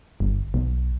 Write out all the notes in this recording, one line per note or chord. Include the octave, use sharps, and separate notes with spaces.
G1
B1